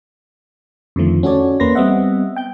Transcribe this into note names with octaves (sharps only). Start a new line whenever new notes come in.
F2 D3 D#3 F3 A3
C#4 F#4 A4 C#5 D5
E2 A#3 C#4 B4 C6 A#6
G3 B3 C4 D#5 E5 F#5
G5 G6